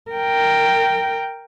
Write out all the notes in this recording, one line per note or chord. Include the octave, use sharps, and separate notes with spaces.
A#4 G5